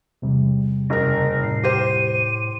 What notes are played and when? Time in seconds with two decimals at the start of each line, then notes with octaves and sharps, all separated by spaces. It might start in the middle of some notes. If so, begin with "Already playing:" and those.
0.22 E2 C3 G3
0.90 F#1 A#4 A#6
1.43 A2 C7
1.63 G4 C5 D#7